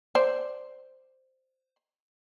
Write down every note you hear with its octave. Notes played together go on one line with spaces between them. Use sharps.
C5 D5